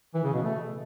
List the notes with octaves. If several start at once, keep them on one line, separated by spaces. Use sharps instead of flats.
E3
C#3
B2
A3